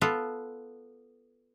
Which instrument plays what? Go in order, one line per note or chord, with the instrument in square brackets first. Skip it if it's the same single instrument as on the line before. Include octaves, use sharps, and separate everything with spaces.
[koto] B3 F4 A4